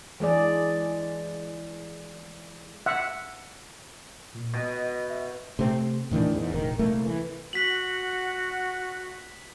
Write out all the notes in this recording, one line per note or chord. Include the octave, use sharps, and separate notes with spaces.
E3 G#3 G#4 D5
E5 F#5
A#2
B2 D#5
E5
C3 A3 C4
A2 D#3 E3 D4
E2 G#2
F1 A#1 D#3
C2 A3 A#3
E3
F#4 F#5 B6 F#7